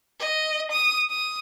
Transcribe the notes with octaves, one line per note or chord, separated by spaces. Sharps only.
D#5
D#6
D#6